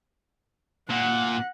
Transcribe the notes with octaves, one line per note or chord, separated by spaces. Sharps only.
A#2 F#5